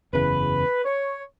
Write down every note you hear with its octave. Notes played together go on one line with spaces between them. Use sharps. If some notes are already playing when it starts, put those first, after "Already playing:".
F#1 E2 C#3 B4
C#5